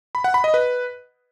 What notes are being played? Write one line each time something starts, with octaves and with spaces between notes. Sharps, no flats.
B5
F#5
B5
D#5
B4